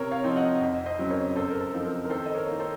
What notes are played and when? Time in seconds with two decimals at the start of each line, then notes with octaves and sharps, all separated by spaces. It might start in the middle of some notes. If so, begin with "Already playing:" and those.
Already playing: C3 A#4 C#5
0.11 C#5 F5
0.24 F3 C4 D#4
0.36 D#5 F#5
0.61 F2
0.86 C5 D#5
0.98 C#3 F#3 C4
1.10 A#4 C#5
1.35 F#2 A4 C5
1.51 A#4
1.61 A4
1.73 F3 C4 D#4
1.85 A#4
2.05 A#4
2.10 D#3 A4 C5
2.26 D#5
2.35 A#4 C#5
2.48 A#3 D#4
2.60 A4 C5